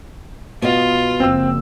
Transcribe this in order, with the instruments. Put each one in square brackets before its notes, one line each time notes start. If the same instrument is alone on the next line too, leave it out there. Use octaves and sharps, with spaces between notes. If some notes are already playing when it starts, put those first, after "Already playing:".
[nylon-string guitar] B2 B3 D#5 [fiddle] F4
[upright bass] F#1 F3 [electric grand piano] C4 G5 E6